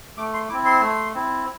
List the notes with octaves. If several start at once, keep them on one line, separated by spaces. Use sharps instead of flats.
A3 D6
C6
C4 E4 D6
C6
A3
C4 E4